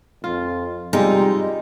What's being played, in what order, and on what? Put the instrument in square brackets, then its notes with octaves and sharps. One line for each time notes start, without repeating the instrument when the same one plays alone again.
[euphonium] F2 [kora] F4
[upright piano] C3 G4 [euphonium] G3 [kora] G#3 F4 G5 [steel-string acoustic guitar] D#4